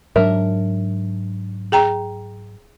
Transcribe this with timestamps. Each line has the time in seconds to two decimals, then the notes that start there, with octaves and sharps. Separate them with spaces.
0.16 G#2 F#3 D4 A#4 E5
1.72 G#4 G5 A#5